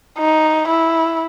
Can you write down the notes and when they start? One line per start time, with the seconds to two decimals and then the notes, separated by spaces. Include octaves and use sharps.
0.18 D#4
0.68 E4